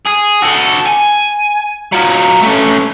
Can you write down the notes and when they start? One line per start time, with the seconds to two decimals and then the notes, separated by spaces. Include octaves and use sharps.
0.07 G#4
0.43 F#4 A4
0.86 G#5
1.92 F#3 F4
2.43 A3 C#4